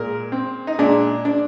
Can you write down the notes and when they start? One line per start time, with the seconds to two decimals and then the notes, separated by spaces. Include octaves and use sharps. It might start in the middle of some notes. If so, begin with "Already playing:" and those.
Already playing: A#2 G#3 A#4
0.32 C4
0.67 D#4
0.79 A#2 G#3 D4
1.25 D4